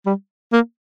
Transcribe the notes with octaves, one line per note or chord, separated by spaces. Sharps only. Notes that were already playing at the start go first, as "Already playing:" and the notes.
G3
A#3